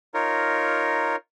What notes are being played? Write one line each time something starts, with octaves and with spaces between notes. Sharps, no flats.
D#4 F4 A#4 C#5